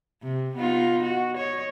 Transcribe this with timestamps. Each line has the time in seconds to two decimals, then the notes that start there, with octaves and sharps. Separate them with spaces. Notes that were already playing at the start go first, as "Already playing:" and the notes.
0.22 C3
0.56 B3 D#4 F4
1.03 F#4
1.37 C#5 D#5